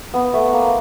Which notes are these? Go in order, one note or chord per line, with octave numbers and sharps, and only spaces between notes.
B3
A3
A#3